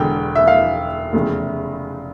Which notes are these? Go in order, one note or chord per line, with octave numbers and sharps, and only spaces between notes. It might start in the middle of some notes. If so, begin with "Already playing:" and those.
Already playing: E1 E2 D3 G5
E5
F5
F1 E2 C#3